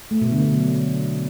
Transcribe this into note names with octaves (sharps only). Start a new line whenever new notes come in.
A3
B2
D3
B2
F#3